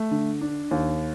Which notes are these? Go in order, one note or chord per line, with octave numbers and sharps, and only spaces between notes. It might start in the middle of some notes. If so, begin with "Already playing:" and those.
Already playing: A3
D3
D4
D#2